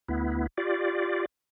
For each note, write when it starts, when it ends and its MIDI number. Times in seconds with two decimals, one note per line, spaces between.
0.09 0.47 38
0.09 0.47 59
0.09 0.47 64
0.58 1.26 65
0.58 1.26 67
0.58 1.26 74